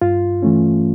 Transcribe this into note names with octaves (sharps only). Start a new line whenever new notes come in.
G2 F4
E3 A3 C#4